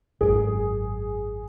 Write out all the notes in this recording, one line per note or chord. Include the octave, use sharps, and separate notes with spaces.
G#1 F#2 G#4